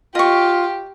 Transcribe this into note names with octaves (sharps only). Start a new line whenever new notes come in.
F4 G4 D#5 C#6